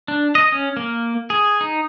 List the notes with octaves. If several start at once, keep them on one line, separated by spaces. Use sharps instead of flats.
D4
D#5
C#4
A#3
G#4
D#4